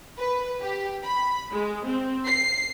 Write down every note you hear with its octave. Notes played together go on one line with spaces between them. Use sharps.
B4
G4
B5
G#3
C4
C7